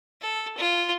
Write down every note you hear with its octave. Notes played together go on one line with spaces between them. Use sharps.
A4
F4